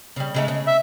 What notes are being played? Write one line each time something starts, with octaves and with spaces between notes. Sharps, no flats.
C#3 G3
C#3 G#3 A3
C#3
E5